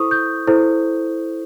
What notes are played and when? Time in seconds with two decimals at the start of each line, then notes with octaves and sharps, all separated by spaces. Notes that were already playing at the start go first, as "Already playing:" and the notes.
Already playing: E4 A4 C5 C#6 D#6
0.11 G6
0.47 E4 A4 C5